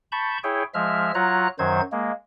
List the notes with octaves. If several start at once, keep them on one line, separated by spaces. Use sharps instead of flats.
A5 B5 C#6 G6
E4 G#4 C#5 G5
F3 G#3 E5 F6
F#3 F4 C#5 A#5 F#6
F#2 D#3 F#3 C5 G#6
G#3 A#3